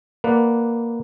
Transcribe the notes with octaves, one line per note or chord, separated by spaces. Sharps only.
A#3 B4 D5 F#5